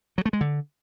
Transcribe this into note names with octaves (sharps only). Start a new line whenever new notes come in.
F#3
A3
G#3
D3